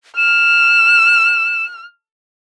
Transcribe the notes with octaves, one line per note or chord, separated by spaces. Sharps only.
F6 E7